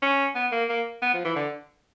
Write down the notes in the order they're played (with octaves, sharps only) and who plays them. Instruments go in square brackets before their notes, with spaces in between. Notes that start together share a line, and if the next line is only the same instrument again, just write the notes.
[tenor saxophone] C#4
B3
A#3
A#3
B3
F3
E3
D3